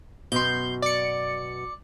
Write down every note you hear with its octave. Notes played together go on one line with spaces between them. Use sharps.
F#2 B2 C6 G6
D5 C#7